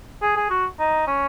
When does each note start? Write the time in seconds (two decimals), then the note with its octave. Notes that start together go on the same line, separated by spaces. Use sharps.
0.22 G#4
0.36 G#4
0.50 F#4
0.79 D#4
1.07 C#4